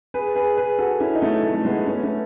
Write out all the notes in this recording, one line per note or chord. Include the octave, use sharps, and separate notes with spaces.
G#4 B4
G#4 B4
G#4 B4
F#4 A4
C#4 E4
D#4
A3 C#4
A3
A3
G#3 B3
C#4
B3
A3 C#4